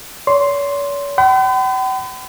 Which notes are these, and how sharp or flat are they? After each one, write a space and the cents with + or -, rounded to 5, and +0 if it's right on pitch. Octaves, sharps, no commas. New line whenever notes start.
C#5 +40 C6 +0
G5 -45 B5 +45